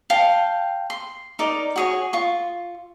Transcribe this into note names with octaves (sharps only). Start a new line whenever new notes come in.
F5 G5 A5
C6
D#4 A#4 D5
F#4 G#4 C#5
F4 C#6